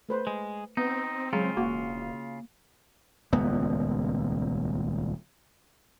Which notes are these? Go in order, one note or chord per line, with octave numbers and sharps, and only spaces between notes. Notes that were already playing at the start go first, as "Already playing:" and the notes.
A3 B4 C5
G#3
B3 C4 D#4
C#3 F#3 G#3 F4
E1 A#3 F#4
D#1 C#2 B3